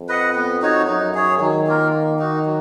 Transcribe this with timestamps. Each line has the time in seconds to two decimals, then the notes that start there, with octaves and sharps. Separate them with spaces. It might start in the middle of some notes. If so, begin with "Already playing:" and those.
Already playing: F2
0.09 B4 D#5 F#5
0.35 B3
0.62 D#4 F#4 C#5
0.87 F#2 D#4
1.14 G#4 C#5
1.40 D#3 F#3
1.67 A#3 F4 A#4
1.93 A#3
2.19 D#4 F#4
2.45 F#3